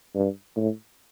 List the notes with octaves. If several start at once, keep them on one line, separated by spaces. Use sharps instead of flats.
G2
A2